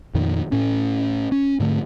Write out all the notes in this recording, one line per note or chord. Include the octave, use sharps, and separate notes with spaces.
F2 A#2 D#3
A2 C#4
C#4
G#2 D3 A3